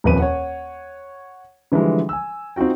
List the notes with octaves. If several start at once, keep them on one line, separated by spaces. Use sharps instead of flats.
D#1 F2 B4 D#7
C#5 F#5
D3 E3 F3 G3 G#3
G#5 E6
C4 D#4 F4 F#4 G5